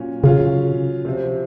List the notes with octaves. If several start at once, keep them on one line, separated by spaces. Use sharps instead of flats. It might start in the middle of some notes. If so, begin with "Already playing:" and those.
Already playing: A#2 F#3 C#4
C#3 F#3 C#4 F4
C3 F3 C4